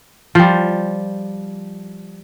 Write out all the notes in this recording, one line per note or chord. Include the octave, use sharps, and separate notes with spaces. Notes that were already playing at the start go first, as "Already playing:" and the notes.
F3 G3